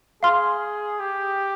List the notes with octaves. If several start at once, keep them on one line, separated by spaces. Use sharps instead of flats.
G#4 F5 C6 F6
G4